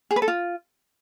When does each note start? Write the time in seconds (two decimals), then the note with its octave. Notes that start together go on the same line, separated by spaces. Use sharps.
0.11 G#4
0.16 B4
0.22 A4
0.28 F4